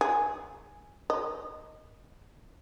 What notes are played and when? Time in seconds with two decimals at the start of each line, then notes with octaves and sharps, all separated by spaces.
0.01 G#4
1.10 D#5